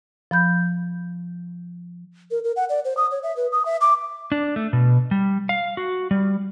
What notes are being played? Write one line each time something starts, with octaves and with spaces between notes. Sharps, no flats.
F3 B5 G6
A#4
A#4
F#5
D5
C5
D#6
C#5
E5
B4
D#6
E5
D6
D4
A3
B2
G3
F5
F#4
G3